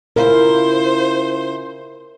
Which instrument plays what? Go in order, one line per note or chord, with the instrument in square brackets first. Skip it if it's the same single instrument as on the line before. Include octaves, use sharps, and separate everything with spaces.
[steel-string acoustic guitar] C#3 E4 F4 [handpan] A#4 [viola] C5